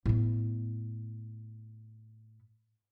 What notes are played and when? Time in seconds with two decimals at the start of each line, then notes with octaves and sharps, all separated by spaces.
0.06 A2 B3